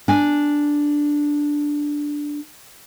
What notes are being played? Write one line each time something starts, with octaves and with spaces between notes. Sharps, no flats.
D4 G#5